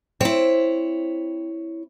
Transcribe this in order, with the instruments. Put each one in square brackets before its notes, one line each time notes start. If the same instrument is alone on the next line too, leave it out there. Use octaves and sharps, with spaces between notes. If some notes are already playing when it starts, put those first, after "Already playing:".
[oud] C4 [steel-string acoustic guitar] E4 C#5